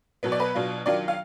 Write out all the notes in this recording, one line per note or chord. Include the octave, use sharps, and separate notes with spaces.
B2 F#3 B3
D5
B4
B2 F#3 D4 F4
D#3 F#3 D4 F4 D5
F5